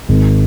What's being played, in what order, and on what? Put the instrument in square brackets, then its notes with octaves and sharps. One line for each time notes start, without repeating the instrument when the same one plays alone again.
[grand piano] G#1